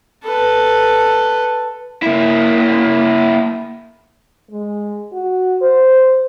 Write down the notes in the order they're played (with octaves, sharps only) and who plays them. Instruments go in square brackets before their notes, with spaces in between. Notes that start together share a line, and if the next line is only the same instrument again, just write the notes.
[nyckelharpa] A4 B4
[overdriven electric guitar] A#3 E4
[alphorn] G#3
F#4
C5